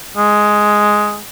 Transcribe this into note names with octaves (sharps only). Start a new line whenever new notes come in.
G#3